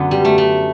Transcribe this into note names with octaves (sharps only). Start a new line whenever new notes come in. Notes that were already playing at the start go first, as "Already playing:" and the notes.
Already playing: F#2 D3 B3
G3
A3
A3